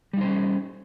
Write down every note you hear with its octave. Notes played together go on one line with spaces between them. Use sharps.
G3 C#4 D#4 C5